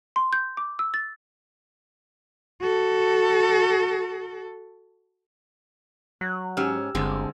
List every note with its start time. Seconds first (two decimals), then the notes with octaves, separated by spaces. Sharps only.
0.16 C6
0.33 G6
0.57 D6
0.79 E6
0.94 A6
2.61 F#4 A4
6.21 F#3 F#6
6.57 G#2 C#4 G4 E6 F6
6.95 G1 D3 G#3 C4